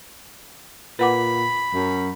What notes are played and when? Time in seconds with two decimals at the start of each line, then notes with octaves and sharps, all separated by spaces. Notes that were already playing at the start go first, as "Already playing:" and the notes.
0.99 A#2 B4 F#5 B5 D6
1.74 F#2